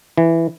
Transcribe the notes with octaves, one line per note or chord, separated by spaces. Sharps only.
E3